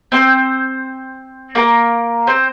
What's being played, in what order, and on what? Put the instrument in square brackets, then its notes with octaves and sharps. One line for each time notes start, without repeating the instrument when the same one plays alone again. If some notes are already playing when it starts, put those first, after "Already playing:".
[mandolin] C4 C5
A#3 A#4
C4 C5